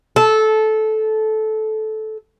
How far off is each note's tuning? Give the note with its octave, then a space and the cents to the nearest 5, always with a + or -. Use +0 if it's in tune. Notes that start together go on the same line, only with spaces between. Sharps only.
A4 -15